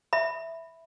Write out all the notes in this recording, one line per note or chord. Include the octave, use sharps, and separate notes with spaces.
E5 B5